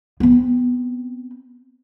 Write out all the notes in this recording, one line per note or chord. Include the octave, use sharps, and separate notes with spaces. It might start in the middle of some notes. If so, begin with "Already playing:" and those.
B3 C4